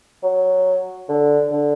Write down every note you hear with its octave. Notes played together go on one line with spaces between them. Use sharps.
F#3
D3
D3